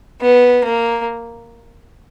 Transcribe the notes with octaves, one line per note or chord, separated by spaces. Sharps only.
B3
A#3